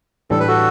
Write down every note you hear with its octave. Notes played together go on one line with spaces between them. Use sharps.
A2 E3 G3 D4 A4
B4
F#4 A4